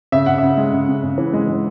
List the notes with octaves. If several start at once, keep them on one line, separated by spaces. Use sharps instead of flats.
C#3 E5
C#3 F#5
C#3 E5
G#3
C#3
C#3
C#3
E3
G#3
G#3